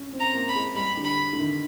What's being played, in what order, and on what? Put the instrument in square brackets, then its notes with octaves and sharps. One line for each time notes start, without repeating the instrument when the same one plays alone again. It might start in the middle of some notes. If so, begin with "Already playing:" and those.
Already playing: [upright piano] C#4
C4
[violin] A#5
[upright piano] A#3
[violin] B5
[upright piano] G#3
[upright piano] G3 [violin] B5
[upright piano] D3
[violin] B5
[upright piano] D3
D#3